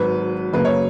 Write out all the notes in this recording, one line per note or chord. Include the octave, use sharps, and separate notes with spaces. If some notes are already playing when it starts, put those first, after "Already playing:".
Already playing: G#1 G#2 F#3 B4
F#2 C#3 F#3 A#3 B4
C#5